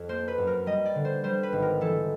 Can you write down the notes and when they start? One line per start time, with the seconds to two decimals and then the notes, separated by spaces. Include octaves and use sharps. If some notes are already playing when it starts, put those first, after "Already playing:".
Already playing: F2
0.09 A#3 C5
0.28 B4
0.38 F#2
0.47 A#4
0.66 G3 D#5
0.85 D5
0.95 D3
1.05 C5
1.24 G3 C5
1.43 B4
1.52 G#1
1.62 A#4
1.81 E3 A4